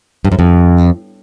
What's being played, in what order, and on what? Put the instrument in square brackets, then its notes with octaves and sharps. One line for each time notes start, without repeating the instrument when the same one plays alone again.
[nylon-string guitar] G2
F#2
F2